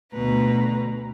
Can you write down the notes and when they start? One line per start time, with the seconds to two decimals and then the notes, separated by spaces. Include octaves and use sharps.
0.13 D2 B2 B4 A#5